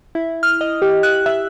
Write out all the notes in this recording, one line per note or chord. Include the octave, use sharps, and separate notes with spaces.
E4
F6
D#5
G4
F#6
E5